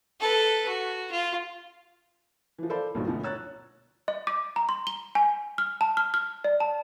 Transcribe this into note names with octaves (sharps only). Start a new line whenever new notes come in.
A4 B4
F#4
F4
E3 F3
A4 C5 D5 F5 B5
B1 G2 A#2 D#3 F#3
D2 B2 D3 F3
C#5 A#5 E6 F#6 A6
D#5
D6
A#5
C6
G7
G#5
F6
A5
F6
F6
D5
A5